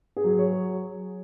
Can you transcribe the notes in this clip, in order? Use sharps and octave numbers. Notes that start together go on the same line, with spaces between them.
G#4
F#3
C#5